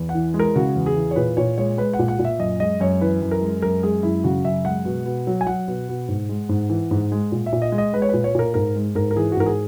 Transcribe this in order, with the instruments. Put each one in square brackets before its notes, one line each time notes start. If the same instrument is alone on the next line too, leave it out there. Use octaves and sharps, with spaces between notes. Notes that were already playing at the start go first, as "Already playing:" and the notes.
Already playing: [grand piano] E2
F#5
E3
G#3
A#4
C#3 F#4
E2
G#4
E3
C#5
A#2 B4
A#2 C#5
G#3 C#5
G#3 B4
F#5
A#2
F#5
A#2
E5
F#2 D#5
G#3 D#5
F#2 C#5
E3 B4
F#2
A#4
G#3
F#2 A#4
G#3 G#4
F#2 E4
C#3 F#4
F#2 E5
G#3 F#5
B2
B2
F#3
G#5
F#3 F#5
B2
B2
G#2
G#3
G#2
E3
G#2
G#3
A#2
E5
A#2
D#5
G#3
D#5
G#3 B4
C#5
A#2 B4
C#5
A#2 A#4
G#2 A#4
G#3
G#2 A#4
A#4
E3 G#4
F#4
G#2 A#4
G#4